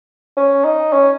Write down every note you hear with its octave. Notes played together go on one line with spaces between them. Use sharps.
C#4
D#4
C#4